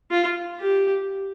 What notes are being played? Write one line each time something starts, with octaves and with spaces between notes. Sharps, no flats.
F4
G4